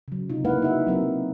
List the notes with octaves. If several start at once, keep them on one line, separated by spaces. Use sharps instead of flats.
C#3 F#3
C3 D#4 F4
G#3 A#3 E4 B4 F5 F#5
D#4 F#4 E5 F#5
F#3 C4 A#4